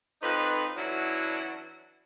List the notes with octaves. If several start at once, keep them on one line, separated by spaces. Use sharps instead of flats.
F2 D#4 B4
E3 F#3 C#4 D4 E4 F#4